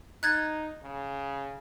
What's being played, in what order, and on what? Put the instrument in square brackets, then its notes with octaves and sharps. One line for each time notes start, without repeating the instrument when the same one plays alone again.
[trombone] D#4 [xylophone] F#6 G#6 A6
[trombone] C#3